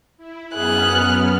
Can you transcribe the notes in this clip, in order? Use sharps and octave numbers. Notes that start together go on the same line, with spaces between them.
E4
F#2 B3 G#4 F6 F#6